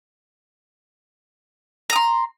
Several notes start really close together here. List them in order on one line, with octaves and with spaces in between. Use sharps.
A#5 D#6 C6